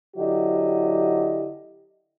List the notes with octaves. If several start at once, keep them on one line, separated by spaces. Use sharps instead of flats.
D3 F#3 E4 G4 D#5